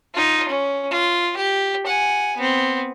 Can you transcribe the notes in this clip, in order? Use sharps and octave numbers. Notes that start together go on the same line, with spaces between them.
D#4 F4
C#4
F4
G4
F#5 G#5
B3 C4